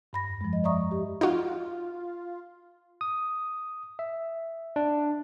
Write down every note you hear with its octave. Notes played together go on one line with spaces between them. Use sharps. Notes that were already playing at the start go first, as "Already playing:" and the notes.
G2 B5 A#6
F2
F3 G#3
D#5
D5 E5 A#5 C#6 D#6
G4
D#4 F4 F#4
D#6
E5
D4